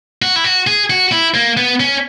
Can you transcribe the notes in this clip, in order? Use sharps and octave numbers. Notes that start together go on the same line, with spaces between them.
F#4
E4
F#4
G#4
F#4
E4
A#3
B3
C#4